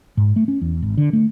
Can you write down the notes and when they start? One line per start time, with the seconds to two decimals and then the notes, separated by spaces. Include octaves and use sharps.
0.17 G#2
0.36 A3
0.48 C#4
0.61 E2
0.82 G#1
0.97 D3
1.13 A3